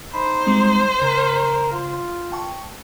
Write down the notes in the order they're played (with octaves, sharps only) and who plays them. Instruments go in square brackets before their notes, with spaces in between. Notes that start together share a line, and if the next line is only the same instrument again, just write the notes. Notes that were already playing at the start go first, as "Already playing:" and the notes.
[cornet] D#4 [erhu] C5 [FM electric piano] B5
[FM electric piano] G3 G#3 C4
[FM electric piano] C#3 [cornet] A#4
[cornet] F4
[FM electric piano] G5 A5 C#6